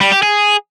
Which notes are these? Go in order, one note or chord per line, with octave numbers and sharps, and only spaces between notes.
G3
G4
G#4